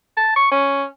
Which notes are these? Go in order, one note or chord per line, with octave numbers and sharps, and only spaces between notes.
A5
C#6
C#4